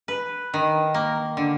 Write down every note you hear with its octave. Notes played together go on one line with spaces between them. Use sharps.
B4
D#3
A#3
D3